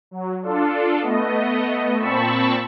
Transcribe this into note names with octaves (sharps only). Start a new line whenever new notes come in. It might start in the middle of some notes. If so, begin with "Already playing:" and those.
F#3
D4 F4 A4
A3 B3 D#5
A#2 C4 A5 B5 C#6 E6